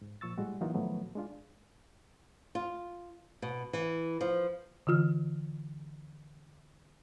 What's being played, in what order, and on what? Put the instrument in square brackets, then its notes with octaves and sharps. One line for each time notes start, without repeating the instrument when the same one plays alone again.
[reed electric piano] G#2
A#2 F3 C#6 E6 A6
A2 G3 G#3 F#4
E3 F#3 A#3 D#4 F4 F#4
A2 D#3 F3 F#3 A3 B3
G#3 D4 F4
[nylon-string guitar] F4
B2
E3
F3
[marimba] D3 E3 F4 F6